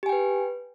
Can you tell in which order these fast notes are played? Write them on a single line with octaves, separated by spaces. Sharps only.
G4 G#5 G5 B4